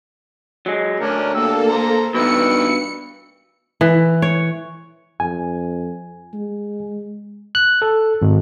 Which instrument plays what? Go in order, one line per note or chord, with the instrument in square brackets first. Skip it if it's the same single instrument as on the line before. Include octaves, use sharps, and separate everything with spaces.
[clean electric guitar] F#3 G#3
[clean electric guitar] D2 [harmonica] C#4 D4 A#4
[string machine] A#3 A4 [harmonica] G4 E6
[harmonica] C5 A#5
[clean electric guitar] G2 B2 [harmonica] D#3 B4 E6 [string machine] C#7
[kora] E3
C#5
[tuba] F2 [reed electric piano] G#5
[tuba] G#3
[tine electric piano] F#6
A4
G#1